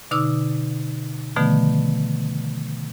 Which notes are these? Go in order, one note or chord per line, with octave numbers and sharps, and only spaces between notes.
B2 D3 D#4 D6 E6
B2 D3 D#3 F3 A3 B3